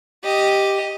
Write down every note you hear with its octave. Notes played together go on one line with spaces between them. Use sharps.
G4 D#5